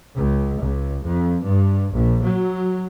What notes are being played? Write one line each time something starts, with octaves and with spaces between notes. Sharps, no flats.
C#2
C#2
F2
G2
A#1
F#3